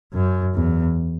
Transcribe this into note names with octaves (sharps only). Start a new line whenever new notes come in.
F#2
E2